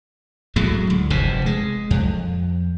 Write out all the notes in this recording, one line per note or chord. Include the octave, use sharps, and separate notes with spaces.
A2 F#3 G#3 A3
D2
F1 G2 C3
G#3
F2